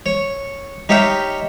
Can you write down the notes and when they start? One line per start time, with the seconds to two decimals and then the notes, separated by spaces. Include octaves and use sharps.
0.06 C#5
0.89 D#4 G4 C#5 E5 F5 G5